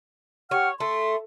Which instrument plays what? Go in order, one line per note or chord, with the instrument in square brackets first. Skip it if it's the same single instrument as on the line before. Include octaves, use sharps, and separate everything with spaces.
[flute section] G4 F#5 F6 [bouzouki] C#5
[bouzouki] A3 [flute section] C6